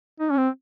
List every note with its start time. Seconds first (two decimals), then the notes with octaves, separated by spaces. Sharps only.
0.20 D#4
0.31 C#4
0.37 C4